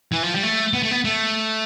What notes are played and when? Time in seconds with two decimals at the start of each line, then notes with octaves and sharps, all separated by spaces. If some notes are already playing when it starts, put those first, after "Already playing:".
0.12 E3
0.23 F3
0.34 G3
0.43 A3
0.73 B3
0.83 A3
0.91 B3
1.04 A3